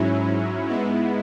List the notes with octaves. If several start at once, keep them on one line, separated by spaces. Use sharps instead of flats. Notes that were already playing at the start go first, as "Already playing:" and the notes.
Already playing: G#2 F#3 C#4 E4
G#2 G#3 B3 E4